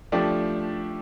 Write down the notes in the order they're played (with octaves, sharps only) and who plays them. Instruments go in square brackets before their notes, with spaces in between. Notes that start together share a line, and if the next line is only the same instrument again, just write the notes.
[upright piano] F3 A3 D4 G4